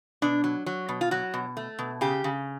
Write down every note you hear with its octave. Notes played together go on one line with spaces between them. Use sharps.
B2 D4
F#3
F#3
B2
F4
F#3 F#4
B2
A3
B2
C#3 G4
C#3